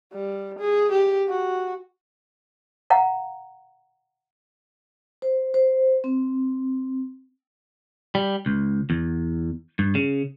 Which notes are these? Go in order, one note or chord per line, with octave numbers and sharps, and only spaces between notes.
G3
G#4
G4
F#4
F5 F#5 A#5
C5
C5
C4
G3
C#2
E2
G2
C#3